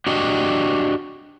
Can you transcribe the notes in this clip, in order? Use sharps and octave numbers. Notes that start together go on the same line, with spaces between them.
D4 F#4 G4 D#5